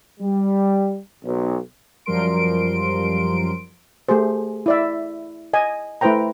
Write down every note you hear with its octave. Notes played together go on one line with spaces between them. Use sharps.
G3
B1
F#2 F3 G3 A#4 C6 D7
A3 G4 G#4 C5
E4 D5 E5
D#5 G#5
A3 E4 B4 C5 G5 A#5